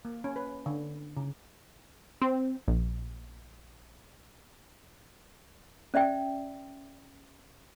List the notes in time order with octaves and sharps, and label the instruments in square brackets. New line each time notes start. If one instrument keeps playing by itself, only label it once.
[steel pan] A#3
C#4
B4
D3
C#3
[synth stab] C4
A#1
[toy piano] C#4 D5 E5 G5